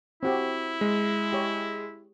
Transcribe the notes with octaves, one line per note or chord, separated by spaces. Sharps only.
C4 E4 F#4 G4
G#3
G4 C#5